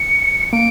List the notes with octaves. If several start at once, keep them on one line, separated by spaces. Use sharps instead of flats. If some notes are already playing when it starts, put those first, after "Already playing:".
Already playing: C#7
A#3 D7